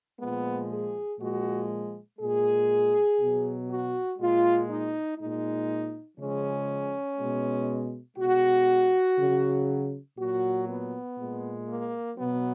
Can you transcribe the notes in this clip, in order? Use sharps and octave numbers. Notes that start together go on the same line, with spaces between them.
A#2 F3 G#3 B3
G#4
A#2 F3 G#3 F#4
A#2 G#3 G#4
B2 F#3
F#4
A#2 G#3 F4
D#4
A#2 G#3 D#4
C#3 F3 G#3 C#4
B2 G#3
B2 G#3 F#4
C#3 F#3
A#2 F#3 F#4
B3
A#2 G#3
A#3
B2 F#3 B3